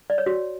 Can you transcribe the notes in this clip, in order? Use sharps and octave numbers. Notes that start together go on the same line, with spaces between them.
D5
C#5
F#4